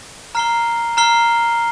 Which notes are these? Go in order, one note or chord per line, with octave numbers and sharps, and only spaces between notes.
A#5 F6 C7 G7
A#5 F6 C7 G7